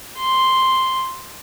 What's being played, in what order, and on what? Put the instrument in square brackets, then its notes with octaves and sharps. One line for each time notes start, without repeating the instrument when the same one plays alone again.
[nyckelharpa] C6